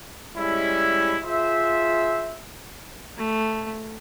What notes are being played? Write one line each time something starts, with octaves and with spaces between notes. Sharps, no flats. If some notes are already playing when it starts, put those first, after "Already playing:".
G3 G#3 C#4 E4
F4 G#4 C5 E5
A3